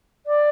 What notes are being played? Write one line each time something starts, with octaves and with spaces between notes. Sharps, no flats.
D5